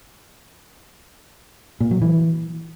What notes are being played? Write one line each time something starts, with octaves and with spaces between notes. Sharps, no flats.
A#2
F#3
E3